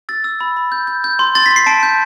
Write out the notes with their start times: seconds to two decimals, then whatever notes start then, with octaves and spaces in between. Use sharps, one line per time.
0.09 E6 A6
0.24 E6
0.41 B5
0.57 B5
0.72 G6
0.87 G6
1.04 G6
1.19 C6
1.35 C6 A6
1.46 B6
1.51 C6
1.56 C7
1.66 A5 D7
1.83 G6